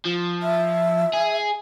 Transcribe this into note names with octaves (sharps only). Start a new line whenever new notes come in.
F3
E5
G#4